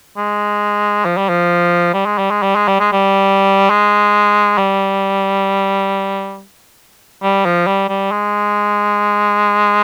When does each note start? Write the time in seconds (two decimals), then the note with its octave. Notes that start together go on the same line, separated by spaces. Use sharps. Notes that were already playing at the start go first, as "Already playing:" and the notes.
0.17 G#3
1.05 F3
1.17 G3
1.29 F3
1.94 G3
2.06 G#3
2.18 G3
2.31 G#3
2.43 G3
2.56 G#3
2.68 G3
2.80 G#3
2.92 G3
3.70 G#3
4.58 G3
7.23 G3
7.45 F3
7.67 G3
7.89 G3
8.11 G#3